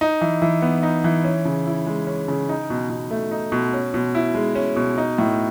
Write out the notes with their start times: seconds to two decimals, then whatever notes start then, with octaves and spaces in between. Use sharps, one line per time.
0.01 D#4
0.21 E3
0.42 E3
0.62 B3
0.83 D#4
1.04 E3
1.24 C#4
1.45 C#3
1.67 E4
1.87 G#3
2.07 C#4
2.28 C#3
2.49 D#4
2.70 B2
2.90 B2
3.11 A3
3.31 D#4
3.52 B2
3.74 C#4
3.94 B2
4.15 E4
4.35 G#3
4.55 C#4
4.76 B2
4.98 D#4
5.18 A2